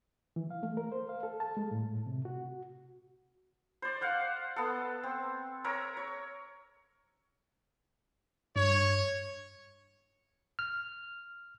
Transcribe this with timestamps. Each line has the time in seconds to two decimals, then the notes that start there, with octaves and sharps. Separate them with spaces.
0.36 E3
0.50 F5
0.63 A3
0.77 A#4
0.92 C5
1.09 F5
1.23 A4
1.40 A5
1.57 G#3
1.71 A2
2.06 C3
2.25 F#4
3.82 C5 D5
4.01 C5 F5 F#5
4.56 B3 A4
5.03 C4
5.64 A#4 C#5 E5 A#5
5.97 C#5
8.56 G2 C#5
10.59 F6